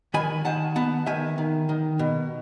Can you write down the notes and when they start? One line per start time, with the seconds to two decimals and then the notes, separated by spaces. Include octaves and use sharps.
0.14 D#3 G#5 B5
0.45 D#3 F#5 A5
0.76 B3 F#5 A5
1.06 D#3 E5 G#5
1.38 D#3
1.69 D#3
1.99 B2